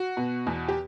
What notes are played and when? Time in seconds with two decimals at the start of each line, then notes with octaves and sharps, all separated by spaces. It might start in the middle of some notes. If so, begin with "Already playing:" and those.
Already playing: F#4
0.17 B2
0.47 E2
0.68 G4